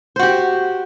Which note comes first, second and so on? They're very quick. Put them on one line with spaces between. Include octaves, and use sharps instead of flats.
C5 F#4 G4